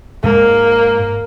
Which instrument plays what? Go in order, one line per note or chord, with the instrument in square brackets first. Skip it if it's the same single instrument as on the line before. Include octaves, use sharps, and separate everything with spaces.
[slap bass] G#2 G#3 [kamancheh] A#3